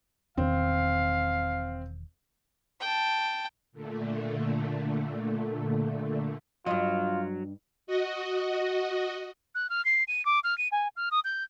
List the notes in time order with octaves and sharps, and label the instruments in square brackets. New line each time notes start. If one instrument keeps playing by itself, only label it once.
[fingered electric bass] E1 E2 D#3 [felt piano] C4 [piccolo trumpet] F5
[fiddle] G5 A5
[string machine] A#2 D3 A3
[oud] G2 D#5 [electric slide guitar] F#3 [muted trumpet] F4
[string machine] F#4 D#5
[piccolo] F#6
F6
C7
D#7
D6
F6
D#7
G#5
F6
D#6
G6